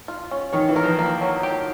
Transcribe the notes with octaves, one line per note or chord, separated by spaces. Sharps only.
F4
C#4
D#3 C#5
E3
A#4
F3
A#3
F#3
G4